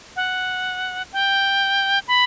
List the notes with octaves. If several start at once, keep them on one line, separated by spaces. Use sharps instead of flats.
F#5
G5
B5